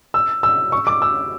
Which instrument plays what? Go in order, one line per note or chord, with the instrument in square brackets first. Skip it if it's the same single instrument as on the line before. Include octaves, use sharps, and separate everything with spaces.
[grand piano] E6
E6
C#6
D6
E6